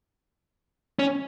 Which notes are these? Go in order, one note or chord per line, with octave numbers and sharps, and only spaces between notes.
C#4